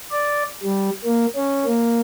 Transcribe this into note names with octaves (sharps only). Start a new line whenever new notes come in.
D5
G3
A#3
C#4
A#3